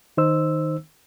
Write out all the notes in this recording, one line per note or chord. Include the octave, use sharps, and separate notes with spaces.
D#3 D#4 C5 E6